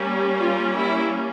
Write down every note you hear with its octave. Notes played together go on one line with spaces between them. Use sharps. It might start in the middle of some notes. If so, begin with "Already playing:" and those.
Already playing: G3 A#3 C#4
F4
E4